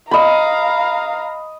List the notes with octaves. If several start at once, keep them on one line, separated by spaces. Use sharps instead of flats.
D#5 F5 A#5 B5